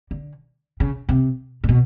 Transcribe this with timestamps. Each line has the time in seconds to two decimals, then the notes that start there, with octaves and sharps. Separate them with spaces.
0.11 D3
0.80 C#3
1.09 C3
1.64 A#2
1.69 B2